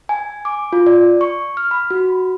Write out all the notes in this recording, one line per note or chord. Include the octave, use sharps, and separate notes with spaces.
G#5
D6
F4
D5
C#6
F6
B5
F#4